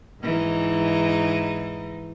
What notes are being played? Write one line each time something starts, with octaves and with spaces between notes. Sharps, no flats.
G#2 E3 D#4